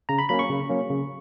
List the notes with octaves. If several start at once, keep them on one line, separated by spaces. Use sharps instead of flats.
C#3 A#5
B5
F#3 A#3 C#4 B5
C#6
C#3
F#3 A#3 C#4
C#3